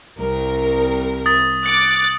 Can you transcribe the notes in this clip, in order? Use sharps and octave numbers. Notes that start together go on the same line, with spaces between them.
C2 A#4
D#6 A6
D6 F#6 A6 C#7